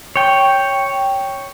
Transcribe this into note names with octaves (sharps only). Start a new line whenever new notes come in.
C#5 G5